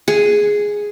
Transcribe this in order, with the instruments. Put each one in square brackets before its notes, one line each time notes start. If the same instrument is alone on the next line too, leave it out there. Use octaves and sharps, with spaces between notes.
[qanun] G#4